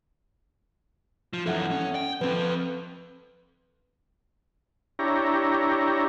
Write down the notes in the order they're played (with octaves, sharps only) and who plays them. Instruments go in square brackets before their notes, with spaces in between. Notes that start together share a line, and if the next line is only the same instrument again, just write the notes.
[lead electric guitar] F3
[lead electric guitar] F#2 E3 [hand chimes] A4 E5 F#5
[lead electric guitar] C#4
G5
[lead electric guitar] F3 A4 [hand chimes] C4 B4
[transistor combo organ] D4 E4 G4 C#5 A#5